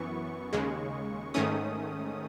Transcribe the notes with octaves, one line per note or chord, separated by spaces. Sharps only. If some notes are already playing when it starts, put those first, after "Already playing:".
Already playing: F#2 E3 B3 C#6
D#2 C#3 G#3
G#2 D#3 A3 C#4 D#6